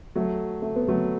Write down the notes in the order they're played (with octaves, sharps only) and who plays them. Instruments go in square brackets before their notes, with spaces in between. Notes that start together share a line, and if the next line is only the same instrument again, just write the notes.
[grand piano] F#3 A3
A3
B3
F#3 A3